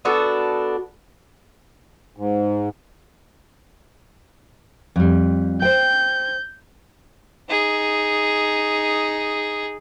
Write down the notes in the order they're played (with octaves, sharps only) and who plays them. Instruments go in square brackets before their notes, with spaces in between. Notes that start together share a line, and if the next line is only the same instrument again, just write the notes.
[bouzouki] B3 D4 F#4 A4
[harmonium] G#2
[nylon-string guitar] F2 G3
[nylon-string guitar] C5 G5 [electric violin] G6
[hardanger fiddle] D#4 G#4